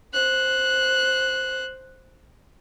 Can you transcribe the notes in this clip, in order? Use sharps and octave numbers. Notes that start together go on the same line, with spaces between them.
C5 F#6